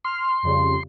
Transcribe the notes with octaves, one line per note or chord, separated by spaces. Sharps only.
C6 F6
F2 C#3 G3